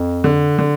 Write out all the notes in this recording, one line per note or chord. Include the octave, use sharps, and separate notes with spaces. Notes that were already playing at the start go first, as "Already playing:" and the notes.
Already playing: F2
D3
D3